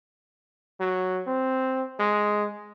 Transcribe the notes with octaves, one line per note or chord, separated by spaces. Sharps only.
F#3
C4
G#3